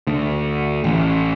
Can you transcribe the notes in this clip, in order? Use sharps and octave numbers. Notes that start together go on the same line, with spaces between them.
D2
A1